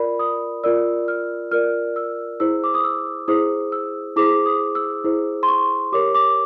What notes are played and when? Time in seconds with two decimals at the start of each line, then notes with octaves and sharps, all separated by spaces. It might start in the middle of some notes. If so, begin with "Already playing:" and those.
Already playing: F4 A#4 D5 B5
0.19 D#6
0.64 F4 A#4 D5 E6
1.08 F6
1.51 F4 A#4 D5 F6
1.96 E6
2.40 E4 G#4 C5 E6
2.64 D6
2.74 D#6
2.84 E6
3.28 E4 G#4 C5 D#6
3.72 E6
4.16 E4 G#4 C5 D6
4.46 D#6
4.75 E6
5.04 E4 G#4 C5
5.43 C6
5.48 C#6
5.92 G4 A#4 C#5 D6
6.15 D6